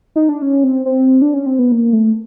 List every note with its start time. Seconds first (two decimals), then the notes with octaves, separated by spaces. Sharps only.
0.16 D#4
0.29 D4
0.42 C#4
0.64 C4
0.86 C4
1.22 D4
1.34 C#4
1.46 C4
1.59 B3
1.72 A#3
1.93 A3